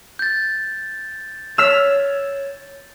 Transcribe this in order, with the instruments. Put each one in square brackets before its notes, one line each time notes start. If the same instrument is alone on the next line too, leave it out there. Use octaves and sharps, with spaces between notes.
[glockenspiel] G6 A6
[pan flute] C#5 [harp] E6 F6 B6